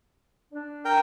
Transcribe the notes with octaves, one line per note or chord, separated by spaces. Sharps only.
D4
A#4 G5